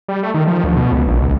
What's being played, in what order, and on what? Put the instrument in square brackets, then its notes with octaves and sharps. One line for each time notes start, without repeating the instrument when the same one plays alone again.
[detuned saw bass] G3
A3
D#3
F3
D2
B2
C#2
A#1
C#2